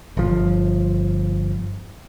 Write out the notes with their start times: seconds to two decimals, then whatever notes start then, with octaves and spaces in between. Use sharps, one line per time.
0.17 G1 F3